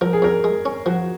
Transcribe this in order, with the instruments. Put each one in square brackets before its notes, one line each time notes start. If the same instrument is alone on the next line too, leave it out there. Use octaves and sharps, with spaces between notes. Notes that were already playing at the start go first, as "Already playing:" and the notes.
[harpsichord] F3 [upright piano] A#4
[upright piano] G#4
[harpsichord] F2 [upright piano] A#4
[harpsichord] G#3
C#4
[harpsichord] F3 [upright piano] F#4